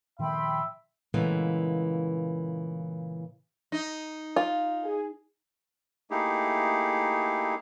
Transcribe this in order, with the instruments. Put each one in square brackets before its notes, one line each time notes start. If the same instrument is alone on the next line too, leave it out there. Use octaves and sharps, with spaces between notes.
[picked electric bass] A#2 D#3 F3 [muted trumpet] E5 [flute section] G5 B5 C6
[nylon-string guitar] A#2 C#3 E3 G#3 A3 B3
[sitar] D#4
[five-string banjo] F4
[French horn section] G#4
[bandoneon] A3 A#3 D#4 E4 G4 G#4